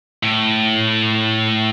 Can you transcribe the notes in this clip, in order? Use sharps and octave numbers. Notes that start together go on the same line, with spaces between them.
A2